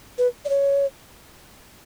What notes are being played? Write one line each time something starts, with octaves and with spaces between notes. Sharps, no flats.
B4
D5
C#5